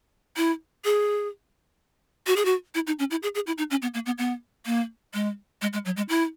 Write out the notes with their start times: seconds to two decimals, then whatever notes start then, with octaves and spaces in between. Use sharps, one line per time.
0.37 E4
0.85 G#4
2.27 F#4
2.36 G#4
2.45 F#4
2.75 E4
2.87 D#4
2.99 C#4
3.11 E4
3.23 G#4
3.35 G#4
3.47 E4
3.58 D#4
3.71 C#4
3.82 B3
3.94 A#3
4.06 B3
4.18 B3
4.66 A#3
5.14 G#3
5.62 G#3
5.73 G#3
5.85 F#3
5.97 G#3
6.09 E4